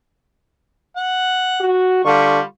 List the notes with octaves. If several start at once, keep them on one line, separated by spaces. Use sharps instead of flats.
F#5
F#4
D3 G3 F4 C#6